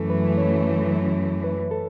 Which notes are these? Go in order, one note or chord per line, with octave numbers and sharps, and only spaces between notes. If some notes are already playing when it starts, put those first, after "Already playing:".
Already playing: F#2 E3 A3 A4
B4
C#5
B4
A4